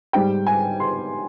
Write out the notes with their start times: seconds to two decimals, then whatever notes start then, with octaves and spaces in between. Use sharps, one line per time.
0.13 G#2 G3 G5
0.46 G#5
0.80 C6